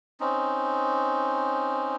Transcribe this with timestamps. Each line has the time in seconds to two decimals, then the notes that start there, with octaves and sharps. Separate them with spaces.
0.20 C4 C#4 D#4